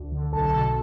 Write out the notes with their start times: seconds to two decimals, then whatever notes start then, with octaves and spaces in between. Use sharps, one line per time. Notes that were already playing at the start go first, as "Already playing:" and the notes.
Already playing: D2
0.12 D3
0.33 B1 A4 A5
0.43 A4 A5
0.54 B2 A4 A5